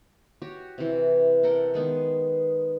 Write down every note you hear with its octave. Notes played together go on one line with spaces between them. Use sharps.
F#4 G4 C#5
C3 E3
A4 A#4 F#5 G5
D#3 G#3 B3